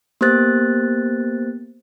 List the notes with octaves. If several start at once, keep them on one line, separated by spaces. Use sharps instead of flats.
A#3 B3 G4 C5 F#6 A6